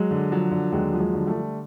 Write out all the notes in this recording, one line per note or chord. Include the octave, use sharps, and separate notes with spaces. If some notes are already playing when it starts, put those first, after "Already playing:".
Already playing: F#3 G#3
D3
F3 F#3
D3
D#2 F#3 G#3
F3
F#3 G#3
D3
G3 A3
D3